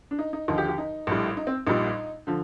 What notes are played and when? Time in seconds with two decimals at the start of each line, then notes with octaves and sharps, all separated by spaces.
0.11 D4
0.19 D#4
0.33 D#4
0.48 D#2 D3 F3 D#4
0.58 G4
0.68 G4
0.78 D#4
1.07 A#1 A2 G3
1.37 D#4
1.47 C4
1.67 A#1 A#2 G3 D#4
2.27 D3 F3